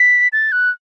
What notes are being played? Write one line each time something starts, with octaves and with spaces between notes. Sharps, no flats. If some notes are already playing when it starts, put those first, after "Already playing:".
Already playing: B6
A6
F#6